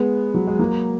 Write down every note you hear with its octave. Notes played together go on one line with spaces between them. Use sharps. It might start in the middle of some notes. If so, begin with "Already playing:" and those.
Already playing: G#3 B3
F#3
G#3
F#3 A#3